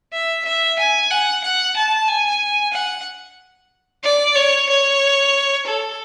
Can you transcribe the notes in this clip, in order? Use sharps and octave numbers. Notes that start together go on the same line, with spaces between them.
E5
E5
G#5
F#5
F#5
A5
G#5
F#5
D5
C#5
C#5
A4